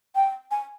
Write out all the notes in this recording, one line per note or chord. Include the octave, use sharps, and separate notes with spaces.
G5
G#5